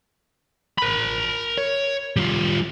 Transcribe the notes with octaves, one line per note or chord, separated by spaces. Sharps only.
A#4 B5
C#5
G3 F4